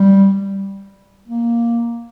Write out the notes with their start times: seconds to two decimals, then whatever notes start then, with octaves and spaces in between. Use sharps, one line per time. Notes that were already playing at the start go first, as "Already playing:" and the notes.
Already playing: G3
1.28 A#3